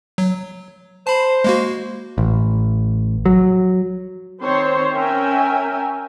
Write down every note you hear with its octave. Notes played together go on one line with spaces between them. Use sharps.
F#3
C5 A5 B5
G#3 A#3 F#4
A1
F#3
D#3 C4 C5 C#5 C6
C#4 A#4 E5 G5 G#5